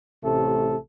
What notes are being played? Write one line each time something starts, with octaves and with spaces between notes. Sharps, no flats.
A1 C3 A3 A4